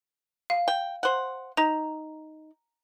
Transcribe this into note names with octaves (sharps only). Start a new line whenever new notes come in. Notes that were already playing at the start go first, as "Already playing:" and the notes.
F5
G5
C5 F#5
D#4 A#5